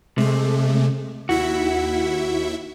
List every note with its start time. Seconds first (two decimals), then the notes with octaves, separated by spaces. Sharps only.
0.18 C3 G#3 A3
1.29 D#2 E4 F#4 E5